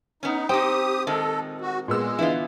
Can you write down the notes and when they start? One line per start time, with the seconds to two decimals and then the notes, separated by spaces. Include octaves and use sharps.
0.23 B3 C#4 D#4
0.49 C4 D#4 G4 G5 D#6
1.07 A#2 D#3 G#3 A4
1.61 F#4
1.88 A#2 G#3 B3 E6
2.19 D3 E3 B3 E4 F4